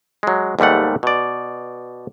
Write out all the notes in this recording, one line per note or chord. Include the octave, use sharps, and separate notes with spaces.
F#3 G#3
D#2 G#2 G3 A3 F#5
B2 D5